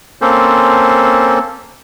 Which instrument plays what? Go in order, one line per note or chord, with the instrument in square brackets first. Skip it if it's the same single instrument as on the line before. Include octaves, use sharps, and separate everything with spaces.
[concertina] A#3 C4 C#4 A4 C5